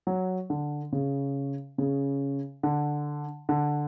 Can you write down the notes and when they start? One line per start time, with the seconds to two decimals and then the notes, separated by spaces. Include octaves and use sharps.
0.07 F#3
0.50 D3
0.92 C#3
1.78 C#3
2.63 D3
3.49 D3